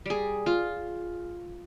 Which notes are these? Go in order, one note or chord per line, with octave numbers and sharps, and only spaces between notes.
G3 G#4
F4